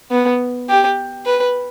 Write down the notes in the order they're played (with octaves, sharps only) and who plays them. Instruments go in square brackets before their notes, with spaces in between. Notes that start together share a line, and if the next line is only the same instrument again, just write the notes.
[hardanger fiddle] B3
G4
B4